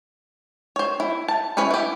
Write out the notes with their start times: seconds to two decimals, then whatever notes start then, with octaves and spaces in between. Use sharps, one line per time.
0.76 C5 C#5
1.00 E4
1.28 A5
1.57 C#4 E4 B4 C#5 G#5
1.71 E4 G4